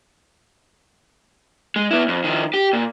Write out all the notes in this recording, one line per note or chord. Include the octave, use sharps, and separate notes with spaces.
G#3
B3 E4
F2
D#3 F3
G4
A#2